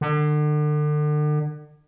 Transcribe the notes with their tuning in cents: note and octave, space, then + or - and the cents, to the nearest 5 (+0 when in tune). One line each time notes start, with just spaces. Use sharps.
D3 +35